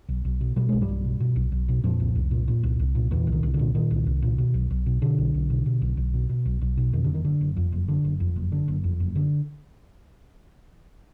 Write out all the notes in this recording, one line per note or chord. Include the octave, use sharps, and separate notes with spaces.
B1
B1
B2
B2 G3
B1 G#3
G2 G3
B1
B2
B2
B1
B1
B2
F2 A#2 F3
C2
C2
A#2
A#2
C2
C2
A#2
E2 A#2 E3
C2
D#3
C2
D3
A#2
A#2 D#3
C2
C2
A#2
B2
B1
B1
B2
B2 D3
B1
B1
B2
B2
B1
B1
B2
B2
B1
B1
B2
F2 D#3
F#1 D3
D#3
D3
F#1
F2
F#1
D3
F#1
F2
F#1
D3
F#1
F2
F#1
D3